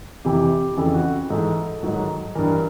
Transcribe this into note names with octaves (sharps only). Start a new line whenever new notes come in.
F2 C3 E3 G4
F2 C#3 E3 A4
F#4
G#2 E3 A4
G#2 D#3 F#3
G2 E3 A#4